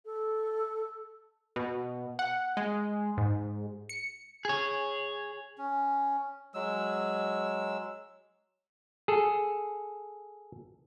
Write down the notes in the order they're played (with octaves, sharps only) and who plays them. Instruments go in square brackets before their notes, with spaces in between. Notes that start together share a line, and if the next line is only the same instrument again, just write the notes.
[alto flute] A4
[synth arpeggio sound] B2
F#5
G#3
G#2
C#7
[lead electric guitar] G#4 C#5
[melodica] C#4
F#3 G#3 E6
[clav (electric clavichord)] G#4 A4